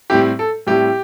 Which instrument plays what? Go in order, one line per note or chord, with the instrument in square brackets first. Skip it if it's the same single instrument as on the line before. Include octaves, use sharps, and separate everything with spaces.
[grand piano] A2 G3 C4 E4 [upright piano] G4
[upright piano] A4
[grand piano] A2 G3 C4 E4 [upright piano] G4